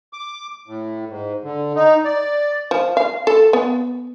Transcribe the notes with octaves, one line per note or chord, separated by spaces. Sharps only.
D6
A2
G#2
D3
D#4
D5
F3
F5
A4
B3